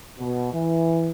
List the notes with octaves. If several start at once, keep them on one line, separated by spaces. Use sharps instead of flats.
B2
E3